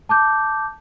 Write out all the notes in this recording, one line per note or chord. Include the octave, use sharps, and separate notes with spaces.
A5 D6 G6